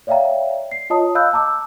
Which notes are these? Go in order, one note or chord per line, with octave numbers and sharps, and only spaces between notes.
C#5 D5 E5 F5 G5 A#5
C7
F4 C#5 D#5 A5 A#5 D#6
D#5 F5 B5 E6 F#6 G6
A5 A#5 D6 E6